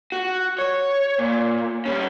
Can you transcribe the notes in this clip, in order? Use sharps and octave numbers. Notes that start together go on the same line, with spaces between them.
F#4
C#5
A#2
G3 C#4